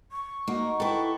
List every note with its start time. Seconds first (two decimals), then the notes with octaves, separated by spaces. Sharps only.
0.12 C#6
0.48 A#3 D#4 F#4
0.80 E4 G4 A4 B4